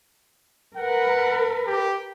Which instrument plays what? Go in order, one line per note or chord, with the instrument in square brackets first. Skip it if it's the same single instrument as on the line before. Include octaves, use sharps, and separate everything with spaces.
[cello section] A#4 B4 [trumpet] F#5
[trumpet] G4